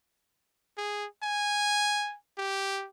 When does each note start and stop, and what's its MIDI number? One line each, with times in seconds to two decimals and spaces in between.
0.77 1.06 68
1.23 2.16 80
2.38 2.87 67